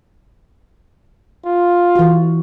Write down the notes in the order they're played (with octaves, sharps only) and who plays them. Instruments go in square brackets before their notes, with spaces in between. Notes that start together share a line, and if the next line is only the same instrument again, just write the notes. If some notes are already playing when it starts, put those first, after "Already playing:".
[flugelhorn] F4
[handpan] E3 F#4